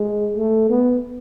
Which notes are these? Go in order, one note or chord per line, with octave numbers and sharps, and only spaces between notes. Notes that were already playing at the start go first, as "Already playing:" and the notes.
Already playing: G#3
A3
B3